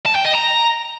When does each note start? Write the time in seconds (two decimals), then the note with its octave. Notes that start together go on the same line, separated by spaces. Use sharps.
0.06 A5
0.15 G5
0.25 D#5
0.34 A#5